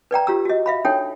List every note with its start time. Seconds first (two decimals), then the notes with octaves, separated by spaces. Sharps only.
0.11 B4 D5 G5 A#5
0.27 F4 G4 A#5 E6
0.45 F#4 D#5
0.66 E5 F5 B5
0.85 D4 D#4 A4 C#5 G5